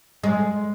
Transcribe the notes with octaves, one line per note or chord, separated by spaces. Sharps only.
G#3